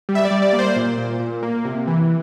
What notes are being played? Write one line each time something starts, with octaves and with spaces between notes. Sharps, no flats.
G3
E5
D5
G3
D5
A#3
C5
A#2
A#2
A#2
A#3
C3
E3